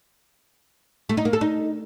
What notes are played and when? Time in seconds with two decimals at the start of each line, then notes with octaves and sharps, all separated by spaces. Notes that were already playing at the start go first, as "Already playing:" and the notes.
1.09 A3
1.17 D#4
1.25 A#3
1.33 A4
1.41 D#4